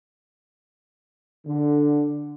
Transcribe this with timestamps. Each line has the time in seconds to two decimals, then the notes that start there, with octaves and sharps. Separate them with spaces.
1.45 D3